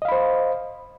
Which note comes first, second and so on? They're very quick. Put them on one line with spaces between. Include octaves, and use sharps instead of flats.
D#5 F5 B5 C5